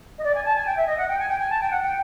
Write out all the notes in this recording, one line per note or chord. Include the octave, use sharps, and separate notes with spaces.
D#5
D5
G#5
A5
G#5
G5
E5
D#5
F#5
G5
G#5
G5
G#5
A5
G5
F#5
G5